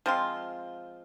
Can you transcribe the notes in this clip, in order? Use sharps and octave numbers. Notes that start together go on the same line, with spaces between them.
F3 G#3 C4 F4